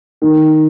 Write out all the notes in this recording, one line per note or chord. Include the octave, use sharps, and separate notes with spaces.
D#3